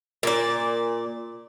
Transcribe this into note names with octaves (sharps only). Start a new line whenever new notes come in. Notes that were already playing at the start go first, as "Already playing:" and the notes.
A#2 D5